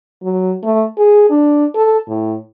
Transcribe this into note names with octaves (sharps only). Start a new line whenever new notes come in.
F#3
A3
G#4
D4
A4
A2